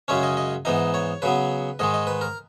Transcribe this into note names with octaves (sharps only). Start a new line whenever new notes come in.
F#2 C#3 G#3 C#4 C#5
D#5
D#5
G#2 E3 B3 D#4 D#5
C#5
C#3 F#3 B3 B4
G#2 D#3 G#3 D#5
D#5
B4
A#4